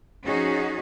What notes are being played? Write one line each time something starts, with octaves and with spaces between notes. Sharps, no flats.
F3 C#4 D#4 F#4 G#4